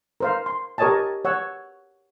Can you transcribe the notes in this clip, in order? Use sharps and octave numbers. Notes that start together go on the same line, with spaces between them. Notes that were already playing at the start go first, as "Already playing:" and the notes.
A#4 C5 F5
C6
G4 A#4 C#5 D#5 G#5 A5
C#5 F#5 E6